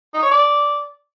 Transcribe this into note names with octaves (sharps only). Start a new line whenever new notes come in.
D#4
C#5
D5